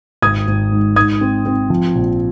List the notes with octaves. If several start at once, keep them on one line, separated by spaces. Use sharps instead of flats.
G#1 D#6 G#6
G#1
G#2
G#2 D#6 G#6
C4
C4
F3
A#1